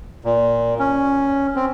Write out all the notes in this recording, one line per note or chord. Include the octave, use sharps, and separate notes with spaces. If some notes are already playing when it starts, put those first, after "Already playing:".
A#2
C#4
C4